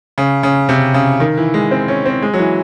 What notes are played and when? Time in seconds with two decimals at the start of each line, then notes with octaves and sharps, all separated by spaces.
0.18 C#3
0.43 C#3
0.69 C3
0.94 C#3
1.20 D#3
1.37 E3
1.54 G#3
1.71 C4
1.88 C#4
2.06 C4
2.22 G#3
2.34 F#3
2.39 E3